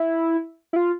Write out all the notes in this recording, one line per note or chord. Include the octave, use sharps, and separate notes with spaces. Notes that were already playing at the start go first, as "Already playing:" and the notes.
Already playing: E4
E4
F4